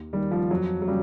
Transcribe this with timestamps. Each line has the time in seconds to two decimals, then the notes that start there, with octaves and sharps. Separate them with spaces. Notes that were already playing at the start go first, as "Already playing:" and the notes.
Already playing: D#2
0.13 D#3 G3
0.31 F3
0.51 F2 F#3
0.82 F#3
0.87 C#3 G3